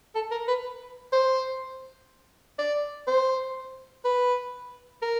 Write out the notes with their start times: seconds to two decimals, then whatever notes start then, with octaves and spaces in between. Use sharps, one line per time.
0.15 A4
0.31 A#4
0.48 B4
1.13 C5
2.59 D5
3.07 C5
4.05 B4
5.02 A#4